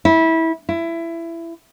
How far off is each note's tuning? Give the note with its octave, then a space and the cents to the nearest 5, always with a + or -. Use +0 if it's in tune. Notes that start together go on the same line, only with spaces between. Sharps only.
E4 -20
E4 +20